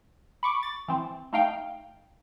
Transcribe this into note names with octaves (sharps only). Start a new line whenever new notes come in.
B5 C#6 D6
A6
E3 C4
A3 D#4 F5 G5